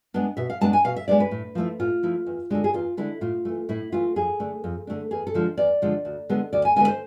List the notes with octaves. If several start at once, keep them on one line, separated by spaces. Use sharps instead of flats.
G#3 B3 D4
B2 E5
F5
G#3 B3 D4 A5
G#5
B2 F5
E5
G#3 B3 D4 D5
B4
A2
F3 A3 E4
A2 F4
F3 A3 E4
E2
D3 G#3 D4 A4
G#4
E2 F4
D3 G#3 D4 E4
A2 F4
E3 A3
A2 E4
E3 A3 F4
F2 G#4
D3 A3 D4
F2
D3 A3 D4
E2 G#4
A4
D3 F3 G#3
E2 D5
D3 F3 G#3
D2
D3 G#3 B3
D2 D5
G#5
D3 G#3 B3 G#5
C5